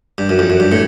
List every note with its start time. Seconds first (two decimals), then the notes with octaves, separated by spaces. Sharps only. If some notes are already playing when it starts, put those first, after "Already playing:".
0.18 G2
0.29 F#2
0.39 F2
0.50 F#2
0.60 G2
0.72 A2